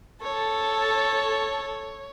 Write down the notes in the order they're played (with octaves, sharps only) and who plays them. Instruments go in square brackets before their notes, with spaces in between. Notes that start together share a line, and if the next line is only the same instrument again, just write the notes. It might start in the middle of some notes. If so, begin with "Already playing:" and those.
[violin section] A4 [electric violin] C#5